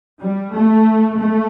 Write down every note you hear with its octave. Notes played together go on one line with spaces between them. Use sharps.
G3
A3
A3